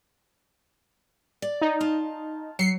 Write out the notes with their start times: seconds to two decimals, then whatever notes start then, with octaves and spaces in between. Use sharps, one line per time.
1.42 D5
1.61 D#4
1.81 F4 A5
2.59 F#3 C7 C#7